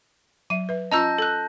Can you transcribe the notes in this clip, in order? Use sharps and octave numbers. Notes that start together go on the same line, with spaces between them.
F#3 E5 D#7
B4 E5
C#4 F4 D#5 A5 A#5 E6 G6 A#6
A4 F#6